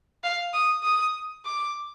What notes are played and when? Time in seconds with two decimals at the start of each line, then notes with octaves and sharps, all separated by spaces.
0.23 F5
0.53 D#6
0.83 D#6
1.45 D6